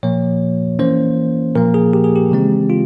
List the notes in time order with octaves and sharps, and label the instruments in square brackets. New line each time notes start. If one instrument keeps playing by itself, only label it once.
[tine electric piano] A#2 F3 A#3 C#5
E3 A#3 C#4 C5
A#2 F3 A#3 A#4
G#4
G4
G#4
G4
C#3 E3 G#3 C4
F4